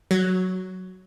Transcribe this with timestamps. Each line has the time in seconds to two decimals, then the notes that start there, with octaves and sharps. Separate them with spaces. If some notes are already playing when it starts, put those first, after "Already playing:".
0.11 F#3